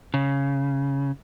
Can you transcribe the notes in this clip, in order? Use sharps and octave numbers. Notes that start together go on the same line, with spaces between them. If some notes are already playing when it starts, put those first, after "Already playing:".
C#3